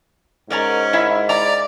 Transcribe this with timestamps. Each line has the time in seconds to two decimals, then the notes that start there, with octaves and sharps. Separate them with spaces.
0.50 G#2 C#4 A#4 D5 A#5
0.93 E4 E5
1.29 D5 A#5